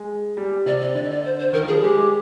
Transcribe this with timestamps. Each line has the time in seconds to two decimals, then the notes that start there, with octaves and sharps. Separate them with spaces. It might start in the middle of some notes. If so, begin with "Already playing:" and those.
Already playing: G#3
0.37 G3
0.51 G3
0.66 C3 D5
0.81 D5
0.95 D3 D5
1.04 D#5
1.10 D5
1.25 C5
1.39 C5
1.53 D#3 A#4
1.63 F3
1.67 G#4
1.72 G3
1.82 G#3 G4
1.96 G#3